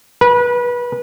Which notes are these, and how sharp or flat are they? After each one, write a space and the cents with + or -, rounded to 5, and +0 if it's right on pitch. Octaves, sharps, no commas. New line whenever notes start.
B4 -25